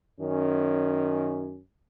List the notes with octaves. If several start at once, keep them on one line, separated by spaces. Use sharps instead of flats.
F#2 D#3 C#4